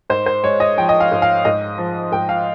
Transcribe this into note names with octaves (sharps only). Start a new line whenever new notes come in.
G#2 C5
C5
G#3 C#5
D#5
F3 G5
D#5
F5
G#2
F5
G#2 D#5
F3
G#2 G5
F5